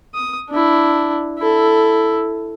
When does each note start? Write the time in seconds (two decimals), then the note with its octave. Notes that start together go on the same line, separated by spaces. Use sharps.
0.15 D#6
0.49 D4 E4
1.38 E4 A4